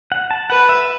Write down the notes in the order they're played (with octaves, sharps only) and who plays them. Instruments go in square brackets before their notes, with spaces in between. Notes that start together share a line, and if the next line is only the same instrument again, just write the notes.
[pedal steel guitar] F#5
A5
[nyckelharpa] B4 [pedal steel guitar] F#5
[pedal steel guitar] E5